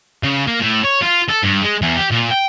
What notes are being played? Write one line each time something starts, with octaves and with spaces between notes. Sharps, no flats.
C#3
A#3
A2
C#5
F4
A4
G2
G#3
E2
G4
A#2
G5